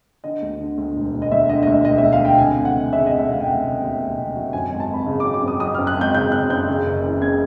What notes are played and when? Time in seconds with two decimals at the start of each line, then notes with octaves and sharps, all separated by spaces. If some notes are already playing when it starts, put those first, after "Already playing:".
0.24 D3 D#5
0.42 D2
0.60 D3
0.78 D2
0.96 E1
1.14 E1
1.22 D#5
1.32 D2 E5
1.49 D3 D#5
1.63 D#5
1.67 D2 E5
1.85 E1 D#5
1.98 E5
2.03 D2
2.13 F5
2.21 D3 G5
2.38 F1 G#5
2.57 F1
2.65 F#5
2.74 F1
2.93 C#3 E5
3.06 F1 D#5
3.19 E5
3.28 F1 F5
3.41 G5
3.46 F1 F#5
3.64 F1
3.81 D#2
4.00 F1
4.18 F1
4.36 F#3
4.53 F#2 G#5
4.67 G#5
4.72 G#1
4.80 A5
4.89 G#1 B5
5.07 C#3
5.20 F#3 D6
5.34 D6
5.43 F#2 D#6
5.60 F#3 D#6
5.75 F#2 F6
5.87 F#6
5.97 G#1 G6
6.14 C#3 G6
6.32 C#3 F#6
6.50 F#2 G6
6.68 C#3
6.86 F#1
7.04 E3
7.22 C#3 G#6